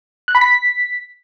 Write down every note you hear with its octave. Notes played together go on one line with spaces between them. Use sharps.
F#6
B5
B6